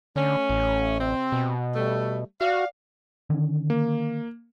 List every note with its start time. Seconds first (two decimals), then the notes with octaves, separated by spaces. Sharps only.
0.16 D3 A3 C#4
0.49 A1
0.99 C3 C4
1.32 B2
1.74 G3 A3
2.41 F#4 D5 F5
3.30 D3 D#3 C#4
3.70 A#3